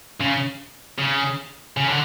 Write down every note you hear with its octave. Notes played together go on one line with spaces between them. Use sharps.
C#3
C#3
C#3
D3